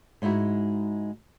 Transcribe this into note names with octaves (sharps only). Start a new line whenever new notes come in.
G#2 G#3 D#4 E4 F#4